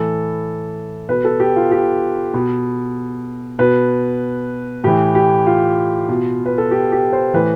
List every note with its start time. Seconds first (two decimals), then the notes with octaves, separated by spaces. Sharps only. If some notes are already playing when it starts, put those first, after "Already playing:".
Already playing: A2 E3 A4
1.09 B2 B4
1.25 A4
1.40 G4
1.56 F4
1.71 G4
2.34 B2
3.59 B2 B4
4.84 A2 E3 G4
5.15 G4
5.46 F4
6.09 B2
6.46 B4
6.58 A4
6.71 G4
6.92 G4
7.13 C5
7.34 A2 E3 B4